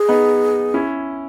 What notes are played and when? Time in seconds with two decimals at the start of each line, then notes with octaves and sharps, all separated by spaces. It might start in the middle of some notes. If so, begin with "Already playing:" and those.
Already playing: G#4
0.08 B3 D#4
0.74 C#4 E4